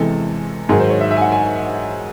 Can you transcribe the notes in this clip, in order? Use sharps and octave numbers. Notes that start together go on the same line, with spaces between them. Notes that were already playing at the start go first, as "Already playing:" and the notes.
Already playing: E2 C3 E3 G#3 A4
G#2 D#3 F#3 G#4
C5
C#5
E5
E5
G#5
F#5
G#5